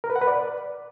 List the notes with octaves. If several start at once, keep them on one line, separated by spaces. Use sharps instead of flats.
A#4
B4
F#5
B4
D5